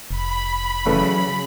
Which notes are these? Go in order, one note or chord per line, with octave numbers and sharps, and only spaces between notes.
F1 B5
E2 C#3 F#3 A3 B4